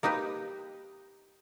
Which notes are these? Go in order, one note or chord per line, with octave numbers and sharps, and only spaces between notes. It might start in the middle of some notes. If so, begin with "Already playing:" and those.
A#3 D#4 G4 B4